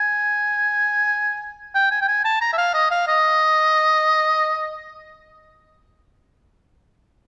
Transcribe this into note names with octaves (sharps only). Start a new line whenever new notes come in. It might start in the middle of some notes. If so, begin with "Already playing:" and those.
Already playing: G#5
G5
G#5
G5
G#5
A5
A#5
E5
F5
D#5
F5
D#5